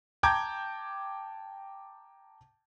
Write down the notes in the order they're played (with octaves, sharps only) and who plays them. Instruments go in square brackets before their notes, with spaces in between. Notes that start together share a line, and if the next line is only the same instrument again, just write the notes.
[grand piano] G5 A5 A#5 D6 G6 G#6